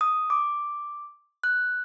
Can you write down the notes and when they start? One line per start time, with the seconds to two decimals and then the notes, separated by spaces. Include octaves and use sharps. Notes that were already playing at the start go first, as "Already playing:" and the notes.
0.01 D#6
0.30 D6
1.44 F#6